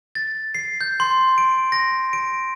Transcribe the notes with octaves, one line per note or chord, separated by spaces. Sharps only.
A6
C7
G6
C6
D7
A#6
D7